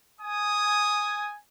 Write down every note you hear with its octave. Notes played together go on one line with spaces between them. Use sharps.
G#5 D#6